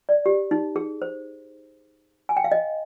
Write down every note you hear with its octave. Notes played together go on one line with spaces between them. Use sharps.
D5
G4
D#4
G#4
C5
G#5
G5
F5
D#5